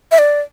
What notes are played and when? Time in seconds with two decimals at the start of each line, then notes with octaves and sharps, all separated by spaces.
0.12 E5
0.19 D5